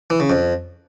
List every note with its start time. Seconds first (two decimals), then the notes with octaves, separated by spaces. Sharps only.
0.10 E3
0.20 C#3
0.30 F2